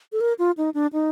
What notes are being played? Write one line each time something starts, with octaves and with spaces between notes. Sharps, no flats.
A4
A#4
F4
D#4
D4
D#4